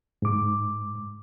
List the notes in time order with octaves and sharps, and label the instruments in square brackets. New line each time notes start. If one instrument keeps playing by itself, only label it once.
[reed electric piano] G#2 D6